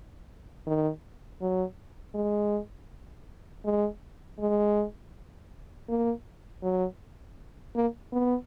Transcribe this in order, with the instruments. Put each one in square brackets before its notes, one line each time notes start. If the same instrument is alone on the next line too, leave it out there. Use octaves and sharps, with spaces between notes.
[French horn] D#3
F#3
G#3
G#3
G#3
A#3
F#3
A#3
B3